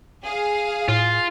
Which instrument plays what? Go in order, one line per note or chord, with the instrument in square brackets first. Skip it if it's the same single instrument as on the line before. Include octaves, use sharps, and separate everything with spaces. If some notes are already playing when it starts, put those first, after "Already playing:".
[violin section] G#4 F5
[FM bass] A2 [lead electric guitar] F4